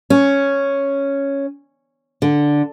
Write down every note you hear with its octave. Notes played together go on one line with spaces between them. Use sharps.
C#4
D3